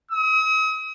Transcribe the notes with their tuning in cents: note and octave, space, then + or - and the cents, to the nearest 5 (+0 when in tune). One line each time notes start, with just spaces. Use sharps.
D#6 +40